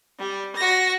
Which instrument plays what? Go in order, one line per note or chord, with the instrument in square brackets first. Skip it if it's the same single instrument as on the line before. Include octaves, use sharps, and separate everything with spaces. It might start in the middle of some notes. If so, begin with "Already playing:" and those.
[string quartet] G3
F#4 A#6